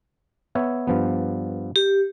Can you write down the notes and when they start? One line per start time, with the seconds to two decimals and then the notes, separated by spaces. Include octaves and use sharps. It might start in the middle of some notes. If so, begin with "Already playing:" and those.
0.55 B3 C#5 E5
0.87 G2 F3 B3
1.76 G4